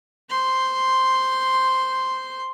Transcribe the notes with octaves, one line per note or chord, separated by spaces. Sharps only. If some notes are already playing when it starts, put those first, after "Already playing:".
C5 C6